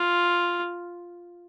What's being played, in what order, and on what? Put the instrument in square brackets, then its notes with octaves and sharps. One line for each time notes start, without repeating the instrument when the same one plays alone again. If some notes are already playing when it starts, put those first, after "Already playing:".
Already playing: [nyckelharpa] F4